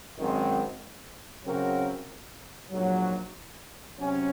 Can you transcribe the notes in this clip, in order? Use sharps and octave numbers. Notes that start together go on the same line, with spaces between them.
G#1 F#2 D#3 G#3 C4
C#3 F#3 C4 F#4 A#4
A#1 G#2 F#3
C3 F#3 C#4